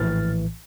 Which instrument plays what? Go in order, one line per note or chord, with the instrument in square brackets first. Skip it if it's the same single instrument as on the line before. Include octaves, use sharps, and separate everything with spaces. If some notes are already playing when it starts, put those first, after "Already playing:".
Already playing: [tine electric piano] A#1 A2 E3 F6 A6